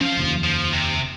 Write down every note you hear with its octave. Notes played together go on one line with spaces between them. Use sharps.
F3 C#4 F5
F1 D#2
F3
C3